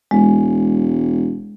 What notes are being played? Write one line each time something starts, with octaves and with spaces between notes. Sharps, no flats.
E1 G#3